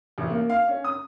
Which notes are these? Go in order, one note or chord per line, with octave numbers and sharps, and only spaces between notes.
A1
A#3
F5
C#4
D#6